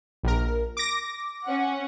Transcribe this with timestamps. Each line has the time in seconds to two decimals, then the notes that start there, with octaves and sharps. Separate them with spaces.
0.23 A#1 A#4
0.77 D6 A#6
1.44 C#4 F#5